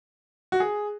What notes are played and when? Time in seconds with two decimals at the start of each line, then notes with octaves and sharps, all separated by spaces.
0.52 F#4
0.60 G#4